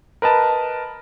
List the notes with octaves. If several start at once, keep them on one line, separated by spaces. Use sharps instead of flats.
A#4 B4 D#5 A5